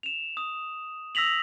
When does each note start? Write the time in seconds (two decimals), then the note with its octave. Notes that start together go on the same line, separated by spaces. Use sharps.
0.03 E7 F7
0.37 D#6
1.15 D#6 E6 A#6 B6 F7 F#7